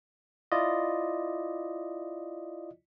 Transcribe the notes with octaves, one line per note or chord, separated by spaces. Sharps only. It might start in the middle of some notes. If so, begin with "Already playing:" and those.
E4 F4 D5 D#5